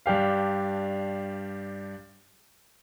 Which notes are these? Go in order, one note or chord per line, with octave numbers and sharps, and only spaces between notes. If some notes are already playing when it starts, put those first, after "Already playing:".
G2 D4 G4 F5